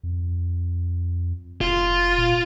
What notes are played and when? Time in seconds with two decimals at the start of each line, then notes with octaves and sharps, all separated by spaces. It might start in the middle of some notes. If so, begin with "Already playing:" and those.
0.03 F2
1.61 F1 F4
2.18 A#2